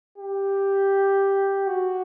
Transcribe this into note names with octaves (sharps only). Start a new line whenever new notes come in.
G4
F#4